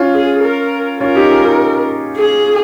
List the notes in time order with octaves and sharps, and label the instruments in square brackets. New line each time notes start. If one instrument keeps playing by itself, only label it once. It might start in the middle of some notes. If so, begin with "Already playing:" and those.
Already playing: [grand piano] C#4 F4
[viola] G#4
A#4
[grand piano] C#4 F4 [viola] A#4
[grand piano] D#4 G4
F4 G#4
D#4 G4
[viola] G#4